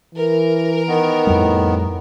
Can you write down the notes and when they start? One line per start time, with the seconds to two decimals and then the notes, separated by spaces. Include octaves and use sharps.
0.15 E3 A#4
0.88 D#3 B3
1.27 F2 A2 G3